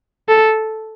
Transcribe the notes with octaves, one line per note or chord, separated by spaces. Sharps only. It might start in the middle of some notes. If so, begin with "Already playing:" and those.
A4